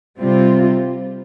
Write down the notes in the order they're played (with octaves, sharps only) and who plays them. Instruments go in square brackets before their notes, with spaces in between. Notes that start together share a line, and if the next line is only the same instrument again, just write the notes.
[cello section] C3 G3 C4 F4